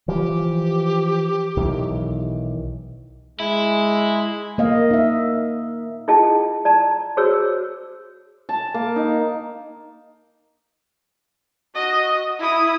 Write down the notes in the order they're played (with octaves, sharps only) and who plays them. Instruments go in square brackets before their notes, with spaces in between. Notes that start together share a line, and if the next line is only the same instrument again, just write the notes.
[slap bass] E3 F3 [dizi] G4
[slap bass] B1 D#3 E3
[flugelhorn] G#3 [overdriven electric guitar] E4
[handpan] A#3 D#5 F5
D#4 E5
[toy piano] E4 F4 G#4 D#5 G5 A5
D5 A5 A#5
F#4 G#4 C5 C#5 E6
[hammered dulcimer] A5
A#3
D#4
[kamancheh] F#4 D#5
E4 D#6